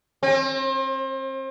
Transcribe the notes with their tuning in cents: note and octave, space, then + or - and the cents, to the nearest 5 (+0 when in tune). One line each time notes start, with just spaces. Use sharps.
C4 +35